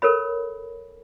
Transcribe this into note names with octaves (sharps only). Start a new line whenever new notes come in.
A4 A#4 C#5 B5